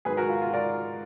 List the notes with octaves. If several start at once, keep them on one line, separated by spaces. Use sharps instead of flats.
G#2 D#3 F#3 G#4 B4
F#4 A#4
F4
F4
A#4 D5